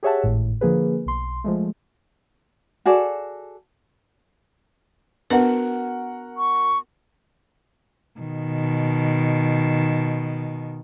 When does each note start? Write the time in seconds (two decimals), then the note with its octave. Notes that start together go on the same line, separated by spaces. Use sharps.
0.03 G4 G#4 C#5 E5 F#5 A5
0.24 G#1 A2
0.61 D3 F3 A#3 G#4 B4
1.06 B1 C6
1.44 F3 G#3 A3
2.86 F#4 G#4 A4 D5
5.30 B3 D4 F#4 A#4 B4 F#5
6.37 C#6
8.20 B2 D#3